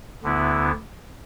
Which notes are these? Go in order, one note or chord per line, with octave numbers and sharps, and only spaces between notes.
D2 D3 B3 E4